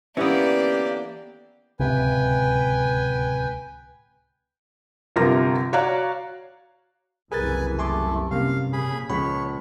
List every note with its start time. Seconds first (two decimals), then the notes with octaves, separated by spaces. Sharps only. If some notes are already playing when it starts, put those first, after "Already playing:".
0.17 D3 E3 A#3 B3 C#4 G4 D5
1.80 D1 C#2 C3 B4 G5 G#5
5.16 G1 C3 F3 F4 A#4 A#6
5.73 F#4 C#5 D5 F5 A#5 F#6
7.32 F#1 C2 E3 G#4 A#4 B4 G#5 A6
7.79 A3 G#5 C6 D6
8.31 G2 C3 A#3 C#4 F5
8.73 A#2 C#3 F3 G#4 B5
9.10 C#2 A#2 F3 C#5 B5 B6